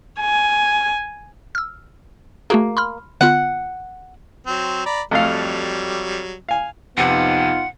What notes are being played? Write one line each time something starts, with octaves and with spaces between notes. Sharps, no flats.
G#5
E6 F6
A3 A#3 F#4 G#4
B5 C6 F6
D3 B3 F4 F#5
F#3 C4
D5 A#5 B5
F2 F#3 G3 A3 F5
F5 G#5
F2 C3 B3 D#4 F4 F#5